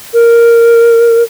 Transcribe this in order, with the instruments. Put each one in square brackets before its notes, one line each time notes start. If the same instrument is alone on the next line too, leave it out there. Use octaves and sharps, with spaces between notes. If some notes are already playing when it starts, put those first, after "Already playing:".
[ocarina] A#4